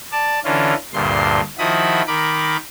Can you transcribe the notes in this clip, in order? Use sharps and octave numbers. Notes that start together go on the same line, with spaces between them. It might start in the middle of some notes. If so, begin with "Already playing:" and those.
D5 A5
D3 E3 C#4 F4
D2 G2 A#2 C6
D#3 F3 E4 F#4 B5 D#6
D#3 A#4 B5 D6